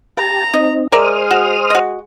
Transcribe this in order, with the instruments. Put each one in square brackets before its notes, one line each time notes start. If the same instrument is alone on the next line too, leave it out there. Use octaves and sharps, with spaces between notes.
[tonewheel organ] G4 A5 [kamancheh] A#5
[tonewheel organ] C4 D#4 [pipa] D#5
[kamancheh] G#3 [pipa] A#4 D5 E5 [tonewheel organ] C5 D#6 F6
[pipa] F#4
F#4 D#5